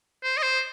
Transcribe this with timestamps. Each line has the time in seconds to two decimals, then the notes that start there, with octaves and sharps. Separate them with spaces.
0.23 C5
0.37 D#5
0.43 C5